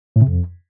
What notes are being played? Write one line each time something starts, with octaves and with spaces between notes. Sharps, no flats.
A2
C3
F2